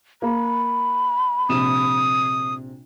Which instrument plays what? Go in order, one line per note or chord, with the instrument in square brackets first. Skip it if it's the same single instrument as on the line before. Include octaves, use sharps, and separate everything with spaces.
[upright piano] A#3 [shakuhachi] B5
[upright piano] A#1 C3 E7 [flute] D#6